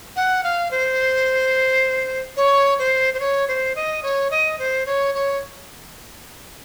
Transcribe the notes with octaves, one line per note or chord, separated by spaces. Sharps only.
F#5
F5
C5
C#5
C5
C5
C#5
C5
D#5
C#5
D#5
C5
C#5
C#5